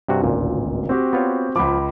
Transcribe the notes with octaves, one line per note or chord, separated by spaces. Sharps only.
G2 C3 F#4
D1 G#1 C#2 A#2
C4 F#4 G4
B3 F4 C#5
C#2 F3 B5 D6